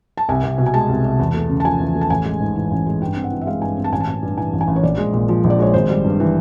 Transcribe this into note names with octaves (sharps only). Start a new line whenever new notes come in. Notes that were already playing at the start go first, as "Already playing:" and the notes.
A5
C2 G#5
C2
B2
G#5
G#3 A5
C2
C2
E2
A3
C#3
A5
F3 G#5
E2
A3
A5
A1 G#5
G#3
G#2
E3
A1
G#3
G2 G5
C4
F#5
E3
E5
G#3 F5
G2 G#5
C4
A5
A1 G#5
A5
A1
G2
E3 G#5
A1
G#5
A1
C#5
A#1 D5
G#3
A#2
F3
A#1
D5
G#3 C#5
G#1 C5
G3
G2
E3